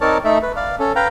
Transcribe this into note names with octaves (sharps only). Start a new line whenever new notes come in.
C4 D#4 A#4 C#5 D5 A5
A3 D#4 A4 E5
B4
D5 F5
C#4 A4
B4 F5 G5 A#5